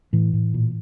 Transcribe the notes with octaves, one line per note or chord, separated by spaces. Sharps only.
A2 E3
A2
A#2